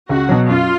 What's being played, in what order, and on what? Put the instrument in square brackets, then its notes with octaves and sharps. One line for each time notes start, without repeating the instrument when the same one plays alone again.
[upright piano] C#2 [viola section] F#4
[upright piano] B2 F#3
[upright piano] F#2 [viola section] F4